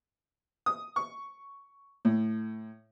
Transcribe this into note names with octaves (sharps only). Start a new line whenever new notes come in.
D#6
C#6
A2